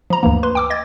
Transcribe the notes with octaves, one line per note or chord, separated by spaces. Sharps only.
F3 A#5
D2 G2 E3 A#3
B4 C6
G5 D6 E6
D#5 G#6 A6